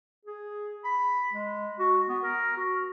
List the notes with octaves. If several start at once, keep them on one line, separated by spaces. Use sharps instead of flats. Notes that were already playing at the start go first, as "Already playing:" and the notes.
G#4
B5
G#3
F#4
B3
A#4
F#4